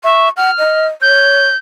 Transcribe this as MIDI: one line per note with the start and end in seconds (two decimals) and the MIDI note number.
0.04 0.29 76
0.04 0.30 85
0.37 0.51 78
0.37 0.86 89
0.58 0.88 75
1.02 1.48 73
1.02 1.56 91